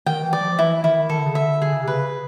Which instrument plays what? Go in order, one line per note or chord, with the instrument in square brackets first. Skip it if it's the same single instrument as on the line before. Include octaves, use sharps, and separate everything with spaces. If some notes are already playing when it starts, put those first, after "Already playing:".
[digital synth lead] D#3 [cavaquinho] G5
[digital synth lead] E3
[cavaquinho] D5
[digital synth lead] F3
F3
[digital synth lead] E3 [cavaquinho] E4
[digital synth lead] D#3 [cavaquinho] E4
[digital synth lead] D#3 [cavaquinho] A4
[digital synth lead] D3
C#3
[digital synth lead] D3 [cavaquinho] E5
[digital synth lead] D3 [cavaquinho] G#4
[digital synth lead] C#3
[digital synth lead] C3 [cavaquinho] B4
[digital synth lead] C#3